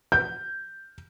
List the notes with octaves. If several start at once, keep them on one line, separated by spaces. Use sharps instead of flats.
G6